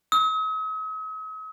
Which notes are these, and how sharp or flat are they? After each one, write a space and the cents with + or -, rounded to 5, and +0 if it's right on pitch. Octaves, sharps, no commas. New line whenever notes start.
D#6 +45